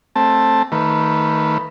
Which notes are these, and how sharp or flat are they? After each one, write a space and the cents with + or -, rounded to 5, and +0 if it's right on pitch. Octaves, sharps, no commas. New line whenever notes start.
A3 +0 C4 +15 A5 +0
D#3 +15 A3 +25 B4 +0